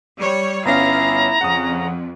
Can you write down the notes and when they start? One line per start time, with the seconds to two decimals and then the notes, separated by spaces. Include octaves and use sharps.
0.18 G3 C#5
0.65 G1 B3 C#4 E4 F5 A#5
1.41 F2 C#3 F#5 D#6